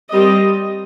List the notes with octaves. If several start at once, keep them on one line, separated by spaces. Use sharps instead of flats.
G3 C4 G4 A#4 D#5